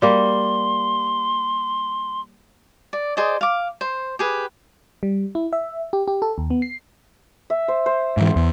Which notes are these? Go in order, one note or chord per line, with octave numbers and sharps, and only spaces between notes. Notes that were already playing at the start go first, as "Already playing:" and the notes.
G3 A#3 C6
D5
G#4 C5 D5 D#5
F5 D6
C5
G4 G#4 B4
G3
E4
E5
G4
G4
A4
D#2
B3
C7
E5
C5
C5
G#2 E3
E2